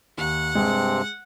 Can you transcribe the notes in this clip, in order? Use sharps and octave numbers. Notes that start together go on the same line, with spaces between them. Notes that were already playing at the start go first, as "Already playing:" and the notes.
D#2 F#5
G2 C3 G#3 C4